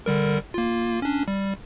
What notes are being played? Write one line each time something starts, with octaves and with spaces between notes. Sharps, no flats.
D3 G3 A#4
A#3 F4
C#4 D4
G3